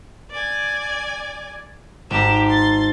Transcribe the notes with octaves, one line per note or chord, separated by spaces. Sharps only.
D5 G#5
G#1 G4 A#5 E7
C6 A6